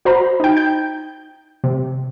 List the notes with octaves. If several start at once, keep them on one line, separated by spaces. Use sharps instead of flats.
F#4 C5 A#5 B5
D#4 G5
G6
C3